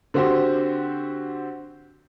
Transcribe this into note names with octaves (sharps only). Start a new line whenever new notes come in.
D3 C4 F#4 G4 C5